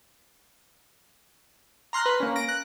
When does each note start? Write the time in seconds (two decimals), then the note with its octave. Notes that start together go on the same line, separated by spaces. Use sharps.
1.93 A#5 C6 F6 F#6 A#6
2.06 B4
2.20 A#3 C#4
2.36 A#6 D7
2.49 F#6